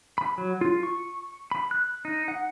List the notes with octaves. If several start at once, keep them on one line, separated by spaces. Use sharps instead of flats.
B5
F#3
F4
C#6
B5
F#6
D#4
F#5